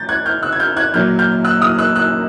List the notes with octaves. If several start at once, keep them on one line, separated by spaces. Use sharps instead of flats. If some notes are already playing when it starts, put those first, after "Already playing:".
Already playing: A2 F3 G6 A6
F#6 G#6
F6 G6
E6 F#6
G#6
F6 G6
F#6 G#6
A#2 F#3 A#3 F6 G6
F6 G6
E6 F#6
D#6 F6
E6 F#6
E6 F#6